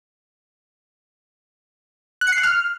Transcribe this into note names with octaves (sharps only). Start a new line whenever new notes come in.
F#6
C#7
C7
F#6
F6